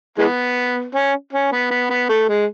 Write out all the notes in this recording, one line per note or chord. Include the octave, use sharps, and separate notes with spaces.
E3 G#3 B3
C#4
C#4
B3
B3
B3
A3
G#3